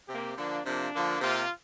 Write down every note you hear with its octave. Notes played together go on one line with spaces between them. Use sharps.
C3 A#3 G4
D3 F3 A#3 D4
C3 F3 A#3 D4
D3 F3 A#3
C3 A#3 F4